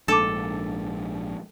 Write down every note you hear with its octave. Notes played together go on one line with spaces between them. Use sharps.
A#1 G#2 D4 A4 A5 D6